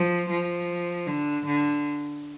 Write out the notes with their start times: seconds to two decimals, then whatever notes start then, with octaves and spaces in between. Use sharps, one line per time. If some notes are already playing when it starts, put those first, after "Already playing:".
Already playing: F3
0.30 F3
1.07 D3
1.45 D3